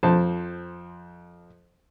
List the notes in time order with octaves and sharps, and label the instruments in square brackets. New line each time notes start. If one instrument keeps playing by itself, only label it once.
[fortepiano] F2 C5 A5